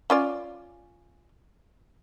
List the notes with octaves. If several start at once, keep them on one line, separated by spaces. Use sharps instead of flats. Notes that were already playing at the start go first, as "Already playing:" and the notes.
C#4 F4 D5